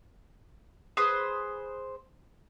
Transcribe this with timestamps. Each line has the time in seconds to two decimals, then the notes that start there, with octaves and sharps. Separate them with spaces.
0.97 G#4 B4 C5 D#6